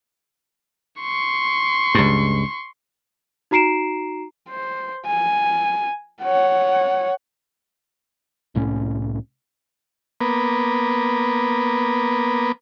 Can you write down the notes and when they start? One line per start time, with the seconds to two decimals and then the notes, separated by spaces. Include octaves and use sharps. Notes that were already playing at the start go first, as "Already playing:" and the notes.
1.02 C6 C#6
1.95 C#2 G2
3.51 D#4 F#4 A#5 C7 D7 E7
4.49 C5
5.06 G#5
6.23 C#5 F#5
8.55 C2 A2 E3 C#4
10.21 A#3 B3